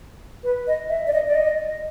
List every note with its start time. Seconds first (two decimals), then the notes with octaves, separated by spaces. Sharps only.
0.43 B4
0.67 D#5
0.89 E5
1.07 D5
1.13 D#5
1.28 D5
1.35 D#5